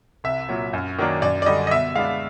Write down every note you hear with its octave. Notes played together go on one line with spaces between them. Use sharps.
C2 E5
A#2 F#3
F#2
D#3 F#3 A#3 D4
F#2 D5
D5
D3 G3 D#5
D#5
B2 E5
G#3 B3 D4 F5